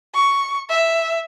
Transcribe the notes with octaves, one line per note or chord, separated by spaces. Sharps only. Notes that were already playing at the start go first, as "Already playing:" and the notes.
C#6
E5